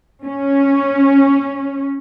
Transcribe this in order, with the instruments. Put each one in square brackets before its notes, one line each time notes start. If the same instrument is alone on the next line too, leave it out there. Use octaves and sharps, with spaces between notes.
[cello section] C#4